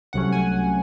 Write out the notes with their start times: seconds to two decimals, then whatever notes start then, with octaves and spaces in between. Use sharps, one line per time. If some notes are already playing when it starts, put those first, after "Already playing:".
0.13 C2 C3 F#3 A3 C#4 F#5
0.32 G#5